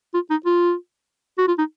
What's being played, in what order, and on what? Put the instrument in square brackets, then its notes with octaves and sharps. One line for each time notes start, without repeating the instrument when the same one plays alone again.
[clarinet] F4
D#4
F4
F#4
F4
D#4